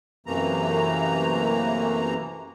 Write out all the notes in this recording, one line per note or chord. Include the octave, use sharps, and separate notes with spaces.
F#2 C3 E3 A3 A#3 A#5